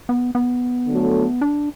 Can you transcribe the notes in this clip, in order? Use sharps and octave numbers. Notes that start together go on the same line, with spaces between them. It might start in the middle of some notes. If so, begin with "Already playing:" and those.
B3
B3
D3 F#3 A3
D4